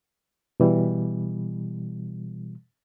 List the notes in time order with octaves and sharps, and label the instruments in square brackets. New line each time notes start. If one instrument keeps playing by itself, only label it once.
[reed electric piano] B2 E3 G3